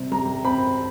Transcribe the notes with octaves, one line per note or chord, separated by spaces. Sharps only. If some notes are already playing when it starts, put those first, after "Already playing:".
Already playing: C3 G3
G3 A#5
C4 B5